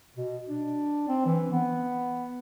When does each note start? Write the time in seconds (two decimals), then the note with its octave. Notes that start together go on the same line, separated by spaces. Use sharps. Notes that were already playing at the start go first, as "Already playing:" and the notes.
0.17 B2
0.49 D4
1.08 C4
1.26 E3
1.52 B3